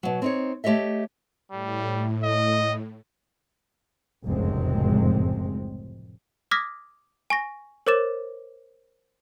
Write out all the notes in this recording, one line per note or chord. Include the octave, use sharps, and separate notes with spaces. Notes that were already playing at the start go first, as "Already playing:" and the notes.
B2 F#3
C4 D#4 C#5
A3 G4 C#5 D#5 E5
A2 G3
D#5
F1 C#2 F#2 A2 G#3 C4
D6 D#6 F6 G#6 A#6 B6
G#5 C#6 A#6
A#4 C5 C#5 D6 A6 E7